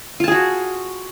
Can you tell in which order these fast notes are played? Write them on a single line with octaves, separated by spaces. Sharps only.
F4 A5 G#4 F#4